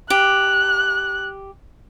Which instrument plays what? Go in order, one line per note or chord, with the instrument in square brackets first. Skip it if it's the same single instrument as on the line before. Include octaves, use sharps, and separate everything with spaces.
[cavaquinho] G4 [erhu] F#6